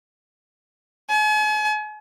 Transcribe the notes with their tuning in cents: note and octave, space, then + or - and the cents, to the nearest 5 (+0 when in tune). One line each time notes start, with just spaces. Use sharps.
G#5 +45